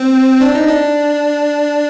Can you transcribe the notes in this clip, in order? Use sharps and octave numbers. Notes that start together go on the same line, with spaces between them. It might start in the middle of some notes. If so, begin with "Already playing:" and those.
Already playing: C4
D4
D#4
D4